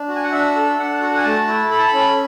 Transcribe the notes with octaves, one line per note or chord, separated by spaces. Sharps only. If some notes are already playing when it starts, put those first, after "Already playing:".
Already playing: D4
F#4
G#5
F#5
D4 E5
A4
D4 F#5
F#4
G#5
A3 A5
E4
A4 B5
A5
B5
C#4